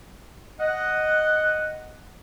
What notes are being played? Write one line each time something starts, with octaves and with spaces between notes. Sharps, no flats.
D#5 F#5